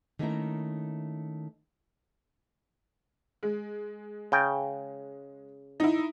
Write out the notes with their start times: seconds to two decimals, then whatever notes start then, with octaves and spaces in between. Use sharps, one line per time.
0.19 D#3 A3 A#3 C#4 E4 A#4
3.43 G#3
4.32 C#3 G5
5.80 D#4 E4